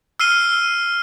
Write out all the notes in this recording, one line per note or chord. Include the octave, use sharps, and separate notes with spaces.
E6 F6 C7 D#7 G7